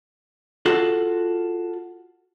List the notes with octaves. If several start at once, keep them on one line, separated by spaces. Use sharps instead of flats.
F4 F#4 A4